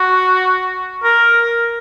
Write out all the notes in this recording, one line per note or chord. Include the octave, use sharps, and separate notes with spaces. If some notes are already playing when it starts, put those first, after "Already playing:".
Already playing: F#4
A#4